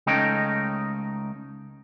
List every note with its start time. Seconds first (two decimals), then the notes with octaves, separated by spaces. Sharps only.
0.07 C#2 A3 C#4 D#4 D#5 G5